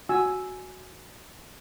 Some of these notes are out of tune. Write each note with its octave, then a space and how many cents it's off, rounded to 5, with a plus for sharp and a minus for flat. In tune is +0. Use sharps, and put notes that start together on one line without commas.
F#4 +0 G#5 +10 E6 +0